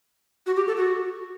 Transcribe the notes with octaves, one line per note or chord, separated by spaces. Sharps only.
F#4
G4
A4
F#4